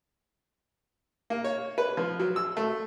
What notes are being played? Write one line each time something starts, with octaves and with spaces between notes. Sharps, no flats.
A#3
C#5
B4
F3
F#3
E6
A3